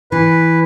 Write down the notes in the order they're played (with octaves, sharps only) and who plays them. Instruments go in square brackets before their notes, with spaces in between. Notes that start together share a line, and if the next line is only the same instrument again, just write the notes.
[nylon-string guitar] E3 [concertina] B4